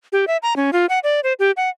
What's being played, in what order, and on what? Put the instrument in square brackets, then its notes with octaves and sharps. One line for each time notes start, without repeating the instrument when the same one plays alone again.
[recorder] G4
E5
A#5
C#4
F4
F#5
D5
C5
G4
F#5